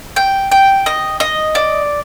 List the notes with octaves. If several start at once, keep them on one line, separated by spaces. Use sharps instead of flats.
G5
G5
D#5
D#5
D5